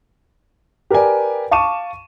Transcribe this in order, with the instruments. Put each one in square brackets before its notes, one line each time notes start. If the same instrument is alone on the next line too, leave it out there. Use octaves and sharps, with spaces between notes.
[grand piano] G4 A#4 B4 D5 G#5
F5 A5 C#6 D6 D#7 E7